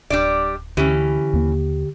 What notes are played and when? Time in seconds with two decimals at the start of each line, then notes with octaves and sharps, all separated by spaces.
0.10 D1 G3 D4 D5
0.77 D2 D3 E3 C#4 G4
1.33 D#2 A#3